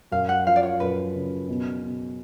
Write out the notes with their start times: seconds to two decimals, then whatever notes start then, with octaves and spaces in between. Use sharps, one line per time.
0.12 F#2 F5
0.29 F#5
0.47 F3 F5
0.56 D5
0.63 C#5
0.80 F#2 B4
1.15 C#3
1.48 B2
1.83 B2